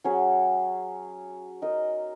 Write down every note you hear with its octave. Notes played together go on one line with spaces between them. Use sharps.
F#3 C#4 G#4 C#5
D#4 A#4 D#5